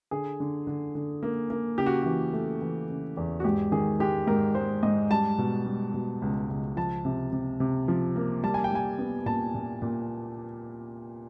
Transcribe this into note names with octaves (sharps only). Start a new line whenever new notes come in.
D3 G#4
D3
D3
D3
A#3
A#3
C#3 G4
F#4
E3 F#4
A3
E3
C#3
E2
F#4
G#2 G4
D#3 G#4
G#3 G4
G#2 A#4
G#3 C5
G#2 D#5
G3 A5
B2
G3
B2
C#2
C#2
F3 A5
C3
C3
C3
F3
A#3
G3 A5
G#5
G5
G3 G#5
B3
A#2 A5
A#2
A#2